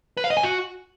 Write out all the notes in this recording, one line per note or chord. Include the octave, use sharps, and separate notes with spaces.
B4
F5
D#5
G#5
F#4